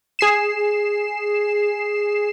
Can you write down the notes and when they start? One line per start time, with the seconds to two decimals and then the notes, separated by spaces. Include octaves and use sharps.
0.19 G#4 C7 E7